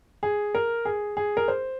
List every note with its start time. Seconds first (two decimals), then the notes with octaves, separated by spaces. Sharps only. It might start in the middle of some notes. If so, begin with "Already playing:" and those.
0.23 G#4
0.55 A#4
0.85 G#4
1.17 G#4
1.37 A#4
1.48 C5